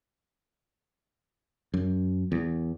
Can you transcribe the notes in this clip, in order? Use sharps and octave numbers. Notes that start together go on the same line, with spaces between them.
F#2
E2